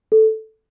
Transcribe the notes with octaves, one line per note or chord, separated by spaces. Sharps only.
A4